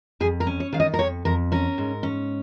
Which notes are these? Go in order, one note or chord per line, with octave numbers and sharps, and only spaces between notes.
F2 G#4
A#4
C#4
C#5
D#3 F5
D#5
A#4
F2 C#5
F2 A#4
C#4 A#4
G#2
C#4